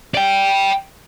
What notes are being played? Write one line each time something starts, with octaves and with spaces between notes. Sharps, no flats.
D5 G5